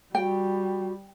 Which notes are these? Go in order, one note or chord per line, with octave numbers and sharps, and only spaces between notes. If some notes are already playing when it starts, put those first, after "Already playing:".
G3 F#4 G5